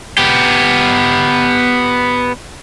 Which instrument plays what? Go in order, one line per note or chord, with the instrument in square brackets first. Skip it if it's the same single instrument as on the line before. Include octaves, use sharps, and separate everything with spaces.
[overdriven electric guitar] B3 G4